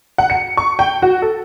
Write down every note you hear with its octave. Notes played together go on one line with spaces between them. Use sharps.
F#5
C#7
C#6
G5
F#4
A4